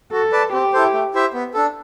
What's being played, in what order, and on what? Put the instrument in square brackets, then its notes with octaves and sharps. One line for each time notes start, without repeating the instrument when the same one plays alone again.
[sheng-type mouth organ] F#4 [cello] A4
[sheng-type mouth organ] B4 D5 A5
[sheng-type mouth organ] C4 [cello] G4
[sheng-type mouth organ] E4 A4 C5
A3
E4 G4 C5 E5
B3
D4 A4